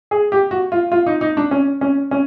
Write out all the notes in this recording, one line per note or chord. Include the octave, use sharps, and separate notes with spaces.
G#4
G4
F#4
F4
F4
D#4
D#4
D4
C#4
C#4
C#4